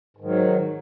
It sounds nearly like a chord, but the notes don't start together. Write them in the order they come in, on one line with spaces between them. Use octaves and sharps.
G#2 D#3 F#3